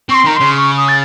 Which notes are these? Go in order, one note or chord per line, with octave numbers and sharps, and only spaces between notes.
C4 C#6
C6
D#3 A#5
C#3 C6
C#6
D#6
A6